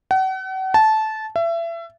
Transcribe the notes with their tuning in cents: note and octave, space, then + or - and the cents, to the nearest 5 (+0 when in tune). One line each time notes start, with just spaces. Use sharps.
F#5 +40
A5 -15
E5 +30